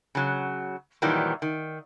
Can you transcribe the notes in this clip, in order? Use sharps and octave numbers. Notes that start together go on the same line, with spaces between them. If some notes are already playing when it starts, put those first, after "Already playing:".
C#3 F#3
A#2 D#3 E3 F#3 G3
D#3